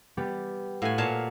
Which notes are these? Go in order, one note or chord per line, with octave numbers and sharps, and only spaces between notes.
G3 B3 G4
A2 F#4 F5 F#5 G#5
A#2 C#5 A5